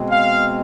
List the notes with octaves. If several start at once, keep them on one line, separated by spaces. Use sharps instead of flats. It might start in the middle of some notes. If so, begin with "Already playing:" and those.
Already playing: B2 G#3 C4
F5